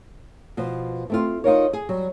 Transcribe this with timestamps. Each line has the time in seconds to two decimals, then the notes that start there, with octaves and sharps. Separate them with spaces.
0.57 B2 F3
1.10 A3 C4 F4
1.44 D#4 F4 A#4 C#5
1.73 G#4
1.89 F#3 G3